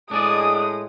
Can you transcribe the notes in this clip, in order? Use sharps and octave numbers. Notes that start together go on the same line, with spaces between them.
A2 G#3 D4 G#4 D5 D#6